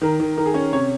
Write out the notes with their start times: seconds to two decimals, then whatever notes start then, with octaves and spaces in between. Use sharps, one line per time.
0.01 D#3 A#4
0.20 D#3
0.37 D#3 A#4
0.46 G#4
0.54 C#4 C#5
0.72 C3 C#5